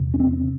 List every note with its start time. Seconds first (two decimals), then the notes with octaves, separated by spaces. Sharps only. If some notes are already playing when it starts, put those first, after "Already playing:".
Already playing: E2 C3
0.14 C#4
0.20 C4